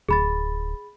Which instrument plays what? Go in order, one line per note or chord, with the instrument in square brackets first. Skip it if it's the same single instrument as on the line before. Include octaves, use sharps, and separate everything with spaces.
[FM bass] D1 [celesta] G#4 B5 A6